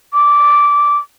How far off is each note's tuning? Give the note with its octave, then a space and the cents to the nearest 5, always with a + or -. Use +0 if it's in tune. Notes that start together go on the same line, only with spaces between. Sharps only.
D6 -10